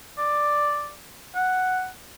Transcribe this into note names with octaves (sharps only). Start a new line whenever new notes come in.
D5
F#5